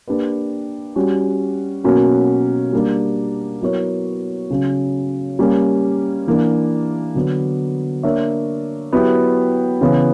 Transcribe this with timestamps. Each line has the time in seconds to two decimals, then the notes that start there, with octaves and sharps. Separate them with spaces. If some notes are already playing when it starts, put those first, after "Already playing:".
0.08 A#3 D4 G4 B4
0.96 G3 C#4 F#4
1.84 B2 F#3 A#3 C#4 F#4
2.73 G3 A#3 D4
3.62 F#3 B3 E4 A#4 C#5
4.50 C#3 F#3 C#4
5.39 G3 A#3 C#4
6.27 E3 A#3 D4
7.15 D3 F#3 B3
8.03 A#3 D4 A#4 C#5 E5
8.93 F#3 B3 E4 G4 B4
9.81 C#3 E3 B3